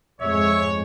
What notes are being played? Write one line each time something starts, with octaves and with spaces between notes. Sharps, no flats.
F2 G#2 G#3 C#5 E5